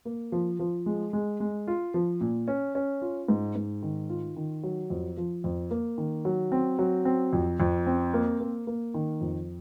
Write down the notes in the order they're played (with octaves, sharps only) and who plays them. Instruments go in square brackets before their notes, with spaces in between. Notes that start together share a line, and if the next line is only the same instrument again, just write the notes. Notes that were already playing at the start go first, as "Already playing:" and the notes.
[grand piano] A#3
F3
F3
G#3
G#3
G#3
F4
F3
A#2
C#4
C#4
F4
G#2
G#2
D#3
F4
D#3
F#3
F2
F3
F2
A#3
D#3
F#3
C4
F#3
C4
F2
F2
C4
A#3
A#3
A#3
D#3
F2